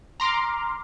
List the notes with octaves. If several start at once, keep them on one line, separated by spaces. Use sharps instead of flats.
A#5 C6 D6 F6